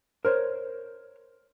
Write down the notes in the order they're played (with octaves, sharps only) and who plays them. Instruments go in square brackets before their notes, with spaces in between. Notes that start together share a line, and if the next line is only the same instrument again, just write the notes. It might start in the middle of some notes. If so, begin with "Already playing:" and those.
[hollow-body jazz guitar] A#4 C5 C#5